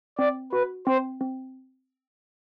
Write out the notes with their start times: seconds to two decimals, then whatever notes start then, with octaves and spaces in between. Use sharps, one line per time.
0.18 C4 D5
0.52 F#4 B4
0.87 C4 C5
1.21 C4